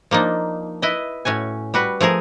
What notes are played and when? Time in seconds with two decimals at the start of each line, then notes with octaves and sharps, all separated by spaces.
0.11 F3 A#3 D4 D#4
0.82 E4 B4 D#5
1.25 A2 C#4 F#4 G#5
1.74 G3 F#4 B4
2.01 F3 A3 G#4 A#4